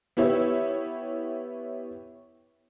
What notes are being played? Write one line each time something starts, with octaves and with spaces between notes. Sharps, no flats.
B3 E4 G4 C#5 E5